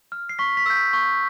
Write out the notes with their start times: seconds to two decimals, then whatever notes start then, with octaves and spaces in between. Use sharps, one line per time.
0.12 F6
0.29 C7
0.39 C#6 B6
0.57 B6
0.66 E6 G6
0.75 B6
0.93 C#6